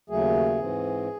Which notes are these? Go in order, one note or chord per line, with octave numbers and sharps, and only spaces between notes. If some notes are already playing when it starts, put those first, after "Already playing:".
D#2 C#3 F#3 A3 G#4
G#2 E3 C4